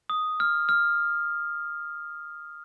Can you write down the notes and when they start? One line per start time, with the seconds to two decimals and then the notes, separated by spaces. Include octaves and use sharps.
0.10 D#6
0.40 F6
0.69 F6